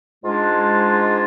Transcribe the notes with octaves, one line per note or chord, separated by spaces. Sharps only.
G#2 G#3 D4 F4